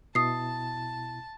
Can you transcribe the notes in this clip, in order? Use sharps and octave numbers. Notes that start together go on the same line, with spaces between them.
B2 E4 A5 D#6 C7